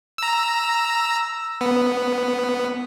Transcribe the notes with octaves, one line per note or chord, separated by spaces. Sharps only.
A#5 E6
B3